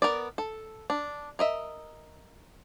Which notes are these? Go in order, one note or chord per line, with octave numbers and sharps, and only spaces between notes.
B3 A#4 B4 D5
A4
D4
A#4 D#5 E5